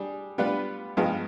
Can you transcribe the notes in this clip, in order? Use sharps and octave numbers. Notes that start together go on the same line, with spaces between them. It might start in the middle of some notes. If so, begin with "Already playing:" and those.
Already playing: G3 D4 G#4
G3 B3 D4 F4 B4
G2 F3 G#3 B3 D#4